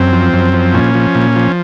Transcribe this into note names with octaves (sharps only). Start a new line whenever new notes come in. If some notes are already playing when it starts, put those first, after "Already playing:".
Already playing: F#2 C4
F3
F#2
F3
A#2 C#4
F3
A#2
F3